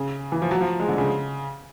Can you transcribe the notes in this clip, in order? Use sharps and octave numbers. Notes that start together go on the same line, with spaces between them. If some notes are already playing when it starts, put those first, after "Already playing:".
Already playing: C#3
E3
F3
F#3
F3
G#3
D3
C#3